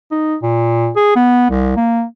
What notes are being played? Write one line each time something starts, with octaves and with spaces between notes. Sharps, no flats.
D#4
A#2
G#4
B3
C2
A#3